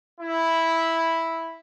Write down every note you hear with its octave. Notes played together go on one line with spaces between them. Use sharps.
E4